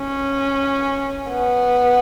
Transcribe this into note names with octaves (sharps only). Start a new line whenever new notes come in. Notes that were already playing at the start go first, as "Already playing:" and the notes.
Already playing: C#4
B3